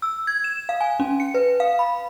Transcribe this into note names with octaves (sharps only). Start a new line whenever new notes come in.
E6
G#6
E7
F5
G#5
C#4
C#7
B4
F5
B5